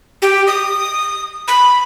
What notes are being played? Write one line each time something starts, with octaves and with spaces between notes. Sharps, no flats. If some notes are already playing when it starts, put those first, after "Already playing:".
G4
D#6
B5